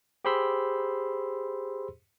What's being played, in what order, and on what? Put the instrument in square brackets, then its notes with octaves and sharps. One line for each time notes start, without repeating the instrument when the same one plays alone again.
[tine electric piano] G4 G#4 C5 B5 C6 E6